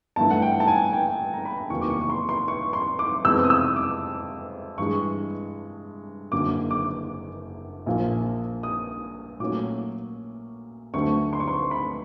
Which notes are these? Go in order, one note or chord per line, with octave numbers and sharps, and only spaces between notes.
G1 G2 E3 A3 A5
F#5
G5
A5
G#5
G5
A#5
B5
E2 C3 D#3 F#3 A#3 C#6
D6
C#6
C#6
C6
C6
C#6
C6
D6
F2 C3 E3 G#3 B3 E6
D#6
E6
D6
G2 E3 G#3 C#6
F#1 F#2 D3 F#3 A#3 D6
D6
A#1 A#2 F3 A#3
D#6
A#2 F#3 A3 C#4 D6
D2 D3 F#3 A3 C#6
C6
C#6
C6
B5